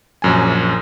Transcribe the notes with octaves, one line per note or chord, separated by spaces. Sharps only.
A#1 F#2 G#5